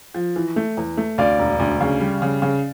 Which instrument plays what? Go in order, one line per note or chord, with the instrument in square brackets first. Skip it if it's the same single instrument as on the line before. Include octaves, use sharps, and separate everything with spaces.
[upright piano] F3
E3
A3
E2
A3
[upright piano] D2 [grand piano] D5 F5
[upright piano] E1
D2
C#3
G3
C#3
C#3